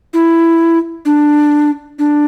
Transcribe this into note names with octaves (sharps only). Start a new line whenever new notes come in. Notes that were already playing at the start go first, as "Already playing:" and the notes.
E4
D4
D4